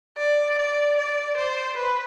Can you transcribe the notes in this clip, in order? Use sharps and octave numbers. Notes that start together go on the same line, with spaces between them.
D5
D5
D5
C5
B4